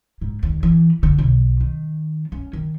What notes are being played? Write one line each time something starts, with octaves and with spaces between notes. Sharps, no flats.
G#2
D#2
E3
D3
B1
D#3
C#4
D#3